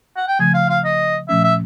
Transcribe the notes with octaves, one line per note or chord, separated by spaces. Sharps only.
F#5
G5
C#3 F3 A3 G#5
F5
F5
D#5
A#2 F3 A3 C#4 E5
E5